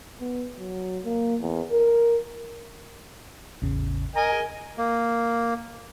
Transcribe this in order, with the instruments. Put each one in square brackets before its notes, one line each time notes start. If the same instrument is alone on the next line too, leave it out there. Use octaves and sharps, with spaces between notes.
[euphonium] B3
F#3
A#3
E2
A#4
[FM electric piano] A1 E2 C#3
[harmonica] A#4 D#5 G#5 [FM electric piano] A#5
[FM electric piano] G#4
[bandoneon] A#3